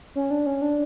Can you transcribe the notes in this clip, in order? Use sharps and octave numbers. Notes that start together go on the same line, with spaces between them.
C#4
D4
C#4
D4